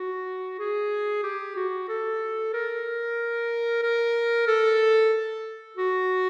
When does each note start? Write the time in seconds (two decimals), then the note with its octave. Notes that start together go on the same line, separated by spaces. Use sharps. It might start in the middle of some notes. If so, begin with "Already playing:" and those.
Already playing: F#4
0.59 G#4
1.23 G4
1.56 F#4
1.89 A4
2.53 A#4
3.83 A#4
4.47 A4
5.77 F#4